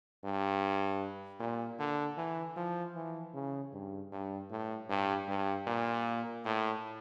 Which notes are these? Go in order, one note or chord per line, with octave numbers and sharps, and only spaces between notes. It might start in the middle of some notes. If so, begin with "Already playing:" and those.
G2
A#2
D3
E3
F3
E3
C#3
G2
G2
A2
G2
G2
A#2
A2